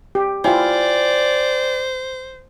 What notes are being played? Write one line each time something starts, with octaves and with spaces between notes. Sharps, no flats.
G4
E4 F4 C5 D5 G5 G#5